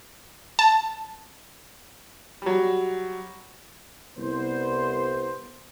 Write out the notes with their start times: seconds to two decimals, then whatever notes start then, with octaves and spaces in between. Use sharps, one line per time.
0.59 A5
2.42 F#3 G3
4.18 C2 B3 C5